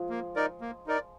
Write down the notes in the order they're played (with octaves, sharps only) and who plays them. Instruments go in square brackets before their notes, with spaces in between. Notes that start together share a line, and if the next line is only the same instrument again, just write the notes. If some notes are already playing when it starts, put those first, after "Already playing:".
Already playing: [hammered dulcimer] F3 G#3
[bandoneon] A#3
D#4 A#4 D5
A#3
D#4 A#4 D5